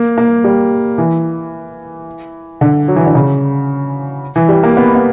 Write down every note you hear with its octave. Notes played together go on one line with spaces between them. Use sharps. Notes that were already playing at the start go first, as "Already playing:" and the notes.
Already playing: A#3
A#3
G3
E3
D3
F#3
E3
D3
C#3
E3
G3
A#3
B3
B3